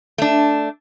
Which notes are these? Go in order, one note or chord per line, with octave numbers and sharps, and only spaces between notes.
A3 D4